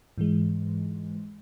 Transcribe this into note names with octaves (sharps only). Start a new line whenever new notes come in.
G#2 E3 G#3